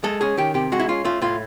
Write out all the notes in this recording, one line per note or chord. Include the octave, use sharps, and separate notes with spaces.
G#3 A4
C#4 G#4
D#3 G4
C3 G4
G#3 F#4
E4
C#4 F4
A3 F4
A2 F4